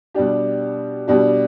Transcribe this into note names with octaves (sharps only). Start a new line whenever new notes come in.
B2 G3 D4 G4
B2 G3 D4 G4